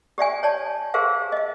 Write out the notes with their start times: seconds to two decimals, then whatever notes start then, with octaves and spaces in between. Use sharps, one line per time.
0.18 G4 D5 E5 G#5
0.43 C#5 D5 A5
0.94 G4 G#4 A#4 C5 E5 F5
1.32 D#5 E5